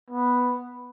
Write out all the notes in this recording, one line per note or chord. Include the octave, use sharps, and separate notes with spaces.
B3